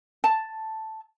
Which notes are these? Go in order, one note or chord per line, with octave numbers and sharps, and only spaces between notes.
A5